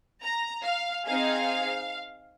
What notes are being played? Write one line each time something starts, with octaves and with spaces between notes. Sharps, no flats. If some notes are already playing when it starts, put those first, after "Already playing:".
A#5
F5
C4 D#4 G#4 F5